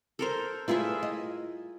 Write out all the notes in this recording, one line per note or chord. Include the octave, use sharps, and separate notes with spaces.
A4 A#4 C5
G3 E4 F4 G#4 B4 E5
D#5